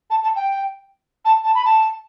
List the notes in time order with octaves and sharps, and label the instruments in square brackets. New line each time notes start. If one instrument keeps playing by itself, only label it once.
[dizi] A5
A5
G5
A5
A5
B5
A5